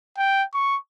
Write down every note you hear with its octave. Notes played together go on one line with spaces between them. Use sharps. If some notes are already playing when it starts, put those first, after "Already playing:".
G5
C#6